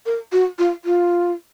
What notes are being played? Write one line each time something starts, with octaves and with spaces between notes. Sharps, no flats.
A#4
F#4
F4
F4